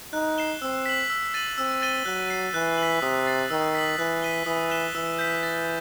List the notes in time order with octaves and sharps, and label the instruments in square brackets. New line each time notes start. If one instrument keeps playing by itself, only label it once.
[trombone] D#4 [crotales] F#6
[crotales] C7 E7 G7
[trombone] C4 [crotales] E6
[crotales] B6 F#7
E6
A6 D#7 F#7
[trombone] C4 [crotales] E6
[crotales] A6 D#7 G7
[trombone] F#3 [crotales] F#6
[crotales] C7 D#7
[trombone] E3 [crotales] F#6
[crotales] B6 F#7
[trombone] C3 [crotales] D#6
[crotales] A6 C7
[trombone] D#3 [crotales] E6
[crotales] B6 F#7
[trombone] E3 [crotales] F#6
[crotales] B6 D#7 G7
[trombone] E3 [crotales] D#6
[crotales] F#6 B6 E7 G7
[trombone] E3 [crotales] E6
[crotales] G6 B6
A6